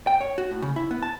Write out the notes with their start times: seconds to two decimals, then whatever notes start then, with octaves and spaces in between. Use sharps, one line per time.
0.07 G5
0.21 C#5
0.38 F#4
0.51 A2
0.62 C#3
0.76 E4
0.91 B3
1.03 A5